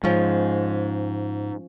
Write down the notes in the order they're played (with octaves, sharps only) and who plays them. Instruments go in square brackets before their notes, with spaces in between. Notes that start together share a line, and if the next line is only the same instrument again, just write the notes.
[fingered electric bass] G#2 [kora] F3 C#4